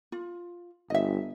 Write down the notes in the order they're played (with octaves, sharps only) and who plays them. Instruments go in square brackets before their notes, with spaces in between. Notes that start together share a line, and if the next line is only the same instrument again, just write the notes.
[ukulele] F4
[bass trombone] G1 [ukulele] D#5 E5